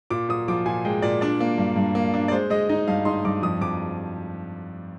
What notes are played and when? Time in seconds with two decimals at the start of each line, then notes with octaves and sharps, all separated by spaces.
0.10 A#2 D6
0.29 A#2 D#6
0.48 F3 D6
0.66 A#2 G#5
0.85 G#3 G5
1.02 A#2 D5
1.21 D4 D5
1.40 A#3
1.58 G2
1.76 G2
1.95 A#3
2.14 D4
2.28 D5
2.31 G#3 C5
2.50 G#3 D#5
2.69 D#4 D#5
2.88 G2 F5
3.05 D#4 C6
3.25 G2 D6
3.42 F2 D#6
3.61 F2 D6